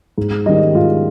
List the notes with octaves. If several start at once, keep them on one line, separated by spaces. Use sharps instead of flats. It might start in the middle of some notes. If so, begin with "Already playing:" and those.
G#2
D#3 G3 D#5
G#2 F4